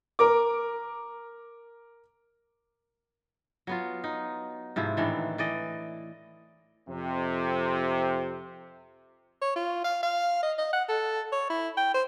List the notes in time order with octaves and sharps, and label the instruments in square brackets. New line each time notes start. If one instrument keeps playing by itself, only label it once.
[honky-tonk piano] A#4 D6
[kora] F#3 B3 F4
D#4
G#2 C3 F3 E4
A2 D#3 E3 D4
E3 D5 D#5
[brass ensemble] F2 C3
[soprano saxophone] C#5
F4
F5
F5
D#5
D#5
F#5
A4
C#5
E4
G5
C5